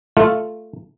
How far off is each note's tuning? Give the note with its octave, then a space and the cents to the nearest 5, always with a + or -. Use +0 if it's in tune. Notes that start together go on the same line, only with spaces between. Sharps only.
A3 +0 F4 +0